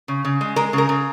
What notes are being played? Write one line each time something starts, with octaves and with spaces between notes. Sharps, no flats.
C#3
C#3
G#3
G#3 A#4
C#3 A#4
C#3